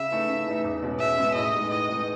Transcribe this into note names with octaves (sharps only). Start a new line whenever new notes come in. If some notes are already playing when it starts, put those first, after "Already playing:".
Already playing: C#3 E5
E3 A3 D#4
C#3
E3 A3 D#4
E2
B2 G#3 C#4
E2 E5
B2 G#3 C#4
A2 D#5
E3 G#3 D#4
A2 D#5
E3 G#3 D#4